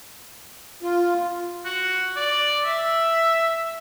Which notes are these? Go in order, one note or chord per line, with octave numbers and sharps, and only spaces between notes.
F4
F#4
D5
E5